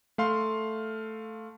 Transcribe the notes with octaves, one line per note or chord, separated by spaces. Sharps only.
A3 F5 C6